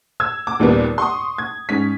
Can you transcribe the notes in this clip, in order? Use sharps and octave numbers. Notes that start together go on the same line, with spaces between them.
E6 G#6
D6
D#2 A#2 G3 B3
C6 C#6 D#6
G#6
G#2 C#4 B6